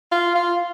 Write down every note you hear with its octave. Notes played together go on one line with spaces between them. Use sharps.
F4
F4